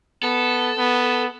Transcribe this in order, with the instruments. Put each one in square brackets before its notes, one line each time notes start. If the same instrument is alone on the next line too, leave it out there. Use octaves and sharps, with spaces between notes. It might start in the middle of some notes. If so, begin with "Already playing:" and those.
[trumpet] B3 [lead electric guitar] A4
[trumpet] B3